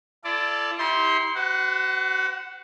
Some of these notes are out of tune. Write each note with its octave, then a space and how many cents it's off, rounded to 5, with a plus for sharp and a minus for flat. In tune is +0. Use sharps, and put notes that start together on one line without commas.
E4 +45 A4 -10 D5 +0
E4 -40 G4 +0 C6 +0
F#4 +30 C5 -45 F#5 +0